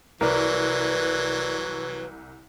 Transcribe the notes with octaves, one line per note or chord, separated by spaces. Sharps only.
C2 E3 F#3 A#4 B4 D5